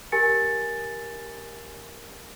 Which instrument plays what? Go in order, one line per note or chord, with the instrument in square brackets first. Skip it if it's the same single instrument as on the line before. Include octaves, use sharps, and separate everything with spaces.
[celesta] G4 A#4 G#5 A6 C#7